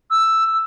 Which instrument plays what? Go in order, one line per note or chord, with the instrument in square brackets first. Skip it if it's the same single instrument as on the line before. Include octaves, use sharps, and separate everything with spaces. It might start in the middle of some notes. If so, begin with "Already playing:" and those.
[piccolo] E6